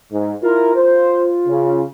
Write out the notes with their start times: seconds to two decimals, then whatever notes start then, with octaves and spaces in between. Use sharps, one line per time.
0.13 G#2
0.43 E4 F4 A#4
0.75 C5
1.48 C#3